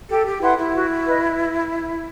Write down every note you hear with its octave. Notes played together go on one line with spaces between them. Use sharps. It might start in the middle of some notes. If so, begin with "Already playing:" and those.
G4 A4
G4
E4 B4 F#5 C6
E4
F#4
B4 D#5